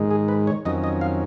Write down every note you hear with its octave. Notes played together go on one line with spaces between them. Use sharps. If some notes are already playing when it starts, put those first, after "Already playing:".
Already playing: G#2 D#3 G#3
G#4
B4
C#5
F2 D#3 F#3 C#4 D#5
D#5
F5